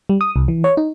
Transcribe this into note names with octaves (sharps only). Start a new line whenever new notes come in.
G3
D#6
C2
E3
C#5
D#4